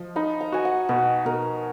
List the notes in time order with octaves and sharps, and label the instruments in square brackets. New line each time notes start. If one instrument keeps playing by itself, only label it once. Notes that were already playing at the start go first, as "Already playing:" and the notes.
Already playing: [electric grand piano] F3 [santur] D#5
[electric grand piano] D#4 [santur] B5
[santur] A#5
[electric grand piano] F#4 [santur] G#5
[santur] F#5
[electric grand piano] B2 [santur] B4
[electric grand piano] B2 [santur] A#4